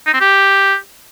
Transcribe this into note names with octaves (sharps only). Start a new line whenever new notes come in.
D#4
C4
G4